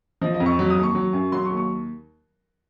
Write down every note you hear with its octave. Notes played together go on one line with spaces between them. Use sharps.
F3 D#5
D#5
F2
C#6
F#3
D#6
D#2
C#6
F#3
F#2
F#3 C6
C#6
D#2
C#6